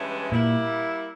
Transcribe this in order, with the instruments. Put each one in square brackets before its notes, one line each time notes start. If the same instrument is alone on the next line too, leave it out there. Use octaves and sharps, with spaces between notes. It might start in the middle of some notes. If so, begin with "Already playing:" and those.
Already playing: [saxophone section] G2 E3 G#3 C#4 E4
[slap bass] A#2 [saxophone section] G3 A#3 E4